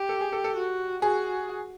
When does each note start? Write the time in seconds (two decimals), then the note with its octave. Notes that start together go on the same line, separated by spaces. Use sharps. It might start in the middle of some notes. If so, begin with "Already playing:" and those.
Already playing: G4
0.09 A4
0.21 G#4
0.33 A4
0.44 A4
0.57 F#4
1.02 F#4 G#4